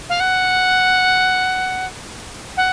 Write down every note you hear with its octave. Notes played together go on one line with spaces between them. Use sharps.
F5
F#5
F#5